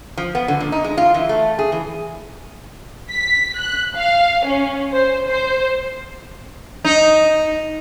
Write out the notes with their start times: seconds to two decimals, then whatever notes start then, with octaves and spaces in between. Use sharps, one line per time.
0.17 F3
0.35 B3
0.48 D3
0.60 A#2
0.72 D#4
0.84 G#3
0.98 F4
1.14 E3
1.29 A3
1.59 G#4
1.72 E3
3.10 B6
3.59 F#6
3.96 F5
4.46 C#4
4.93 C5
5.27 C5
6.85 D#4